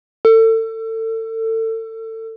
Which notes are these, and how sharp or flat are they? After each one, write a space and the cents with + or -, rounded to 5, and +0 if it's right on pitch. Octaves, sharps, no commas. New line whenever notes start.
A4 +30